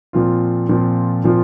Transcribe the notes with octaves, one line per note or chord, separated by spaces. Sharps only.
A#2 F3 C4 F4
A#2 F3 C4 F4
A#2 F3 C4 F4